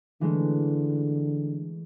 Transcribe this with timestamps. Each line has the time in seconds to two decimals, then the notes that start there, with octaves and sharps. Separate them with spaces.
0.21 D3 E3 G#3 A3